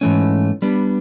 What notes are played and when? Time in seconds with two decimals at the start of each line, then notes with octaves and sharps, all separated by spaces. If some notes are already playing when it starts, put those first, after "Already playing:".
0.01 G#2 E3 A3 C#4
0.62 G3 B3 D4